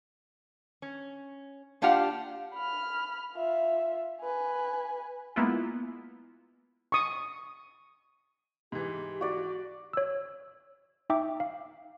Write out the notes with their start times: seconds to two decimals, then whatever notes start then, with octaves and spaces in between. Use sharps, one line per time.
0.82 C#4
1.82 A#3 D4 F4 G4 F5 F#5
2.54 B5 F6
3.34 F4 E5
4.20 B4 G#5
5.36 G#3 A#3 B3 E4 F4
6.92 C#6 D#6
8.72 G#2 E3 G4
9.21 F#4 D5
9.93 C#5 E6
11.10 D#4 E5 G5 D6
11.40 F5